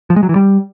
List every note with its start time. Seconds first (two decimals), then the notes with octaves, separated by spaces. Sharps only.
0.10 F3
0.16 G#3
0.23 F#3
0.29 E3
0.36 G3